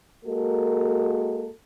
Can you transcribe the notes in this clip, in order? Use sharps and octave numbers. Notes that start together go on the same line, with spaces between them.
G#3 A#3 F#4 A4 A#4